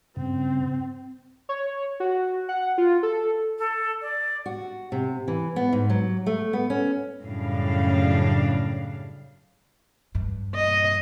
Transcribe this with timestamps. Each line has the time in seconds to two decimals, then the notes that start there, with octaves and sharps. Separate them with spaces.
0.16 G2 C#3 C4
1.49 C#5
2.00 F#4
2.49 F#5
2.78 F4
3.03 A4
3.59 A4
4.01 D5
4.46 F#4
4.92 C3
5.28 E3
5.56 B3
5.73 G#2
5.90 F#3
6.26 A3
6.53 B3
6.70 C#4
7.21 F#2 A2 C#3 G3 D4 F5
10.15 G2
10.56 D#5